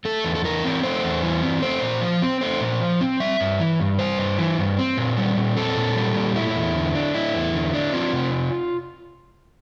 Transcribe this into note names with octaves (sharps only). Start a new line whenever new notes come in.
A3 A4
E2
A4
E3 A#4
C4
A3 C5
E2
E3
C4
A3 C5
A#2
F3
C4
A3 C5
A#2
F3
C4
G3 E5
G2
E3
G2
G3 C5
G2
E3
G2
C4
A#2
G3
A#2
C4 A4
A#2
G3
A#2
A3 E4
E2
D3
D4
A3 E4
E2
D3
D4
C4 F4
C3